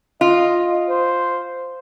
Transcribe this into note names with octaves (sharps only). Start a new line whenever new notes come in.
F4 D#5
C5